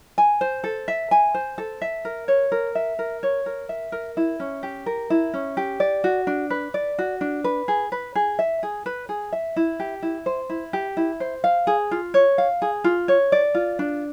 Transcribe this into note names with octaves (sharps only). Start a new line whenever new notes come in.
G#5
C5
A4
E5
G#5
C5
A4
E5
A#4
C#5
A#4
E5
A#4
C#5
A#4
E5
A#4
E4
C#4
G4
A#4
E4
C#4
G4
D5
F#4
D4
B4
D5
F#4
D4
B4
G#4
B4
G#4
E5
G#4
B4
G#4
E5
E4
G4
E4
C5
E4
G4
E4
C5
F5
G#4
F4
C#5
F5
G#4
F4
C#5
D5
F4
D4